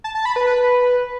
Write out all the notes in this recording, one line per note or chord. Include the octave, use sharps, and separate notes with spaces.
A5
A5
B5
B4
B4